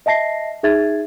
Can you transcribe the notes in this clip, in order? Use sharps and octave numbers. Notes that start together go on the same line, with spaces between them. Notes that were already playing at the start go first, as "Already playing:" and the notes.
D#5 E5 A5 A#6 C7
D#4 G#4 E5 G#6 A6